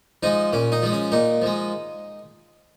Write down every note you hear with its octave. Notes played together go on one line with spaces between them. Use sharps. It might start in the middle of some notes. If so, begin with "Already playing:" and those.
F3 G#3 D#4
A#2 C#4
D#4
F3 G#3
C#4
A#2 D#4
F3 G#3